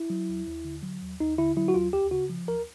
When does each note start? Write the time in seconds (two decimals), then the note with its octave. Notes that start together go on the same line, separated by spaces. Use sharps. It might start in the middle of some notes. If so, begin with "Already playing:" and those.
Already playing: E4
0.10 F#3
0.29 D#2
0.47 D#2
0.65 D3
0.83 F#3
1.02 D#2
1.20 D#2 D#4
1.38 D3 E4
1.57 F#3 E4
1.68 F#4
1.74 D#2 F4
1.93 D2 G4
2.11 C#3 F#4
2.30 F3
2.48 D2 A#4